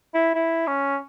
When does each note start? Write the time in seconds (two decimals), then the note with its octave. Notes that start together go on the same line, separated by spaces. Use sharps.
0.14 E4
0.35 E4
0.67 C#4